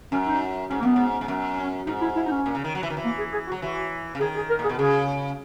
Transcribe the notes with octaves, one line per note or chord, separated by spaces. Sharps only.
F#2 C#4
D#4
G#2 C#4
F#2 A#3 B3
G#2
G#2
F#2
C#4
G#2 D#4
E4
E4
D#4
C#4
A#2
C#3
D#3
F#3
E3
D#3
E3
A#3
G#4
G#4
F#4
F#3
E3 F#4
C#3
D#3 G#4
G#4
A#4
A#2 G#4
B2
C#3 G#4